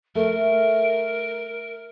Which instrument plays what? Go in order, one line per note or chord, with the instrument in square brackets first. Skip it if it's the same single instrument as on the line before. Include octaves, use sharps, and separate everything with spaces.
[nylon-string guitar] A3 [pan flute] A#4